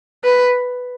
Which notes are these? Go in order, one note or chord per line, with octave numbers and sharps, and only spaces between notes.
B4